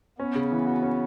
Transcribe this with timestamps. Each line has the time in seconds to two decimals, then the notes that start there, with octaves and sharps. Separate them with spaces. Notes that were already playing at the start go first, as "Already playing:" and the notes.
0.19 B3 C#4
0.36 C#3
0.52 E3
0.67 F#4
0.83 C#4